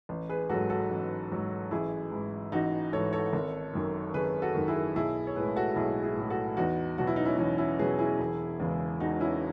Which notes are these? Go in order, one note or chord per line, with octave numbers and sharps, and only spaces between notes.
A1
G#4 B4
G#2 F#3 F#4 A4
F#4 A4
A1
G#2 F#3
A1 E4 G#4
G#2 E3
A1 D#4 F#4
G#2 E3 A4 C#5
A4 C#5
G#1
F#2 D#3
G#1 G#4 B4
F#4 A4
F#2 D#3
E4 G#4
B1 E4 G#4
C#5
A2 G#3 G#4 B4
F#4 A4
F#4
B1 E4 G#4
E4 G#4
A2 G#3
F#4 A4
E2 D#4 F#4
B2 F#3 F#4
E4
D#4
C#4 E4
E2 C#4 E4
C#4 E4
B2 F#3 G#4 B4
E4 G#4
E1
E2 C#3 G#3
E1 D#4 F#4
C#4 E4